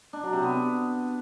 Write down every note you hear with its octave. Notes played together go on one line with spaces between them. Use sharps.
D4
F#3
C3
B3